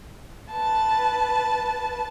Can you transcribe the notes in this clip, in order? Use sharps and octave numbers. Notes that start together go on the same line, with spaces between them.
B4 A5